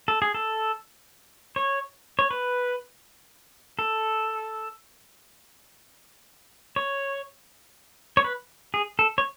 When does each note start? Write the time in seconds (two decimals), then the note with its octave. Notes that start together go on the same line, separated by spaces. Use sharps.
0.08 A4
0.22 G#4
0.34 A4
1.56 C#5
2.19 C#5
2.31 B4
3.79 A4
6.76 C#5
8.17 C#5
8.24 B4
8.74 G#4
8.99 A4
9.18 C#5